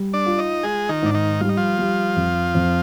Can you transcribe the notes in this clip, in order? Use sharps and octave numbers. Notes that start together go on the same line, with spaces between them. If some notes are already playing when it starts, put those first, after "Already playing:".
Already playing: G3
D4 D5
F4
D#4 D#5
G#3 F4 G#4
D#3 D#4
G#2 D4
D#3 D#4
G3 F4
D#4
F3 F4
G3
F2
F2